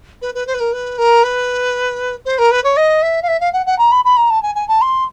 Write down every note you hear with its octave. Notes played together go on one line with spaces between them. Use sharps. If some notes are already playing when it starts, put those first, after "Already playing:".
B4
B4
C5
B4
A#4
B4
A#4
B4
C5
A#4
B4
C#5
D#5
E5
F5
E5
F5
F#5
F#5
A#5
B5
B5
A#5
A5
G#5
G#5
A5
C6